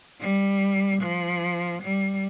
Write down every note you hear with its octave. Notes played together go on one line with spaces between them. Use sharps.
G3
F3
G3